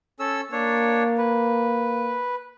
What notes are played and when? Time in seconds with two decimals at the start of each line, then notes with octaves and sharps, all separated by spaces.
0.20 C#4 A4 E6
0.52 A#3 D4 C#5
1.18 B4